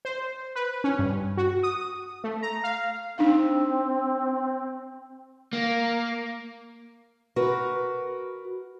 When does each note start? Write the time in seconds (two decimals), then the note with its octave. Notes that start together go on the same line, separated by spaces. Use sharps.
0.05 C5
0.55 B4
0.84 C#4
0.99 G2
1.37 F#4
1.63 D#6
2.24 A3
2.42 A#5
2.64 F5
3.18 C4 D4 D#4 F5
5.53 A#3
7.36 F#4 A#4 B4